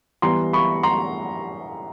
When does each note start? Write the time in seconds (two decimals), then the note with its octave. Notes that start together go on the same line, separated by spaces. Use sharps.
0.22 E3 G3 B3 A#5 C6
0.53 B5 C#6
0.83 A#5 C6